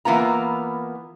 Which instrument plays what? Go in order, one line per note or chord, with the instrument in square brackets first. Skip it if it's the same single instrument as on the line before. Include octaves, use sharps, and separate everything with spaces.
[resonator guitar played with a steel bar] E3 A#3 B3 F4 A#5